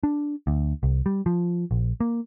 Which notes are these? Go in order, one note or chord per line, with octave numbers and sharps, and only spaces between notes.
D4
D2
C2
G3
F3
A#1
A#3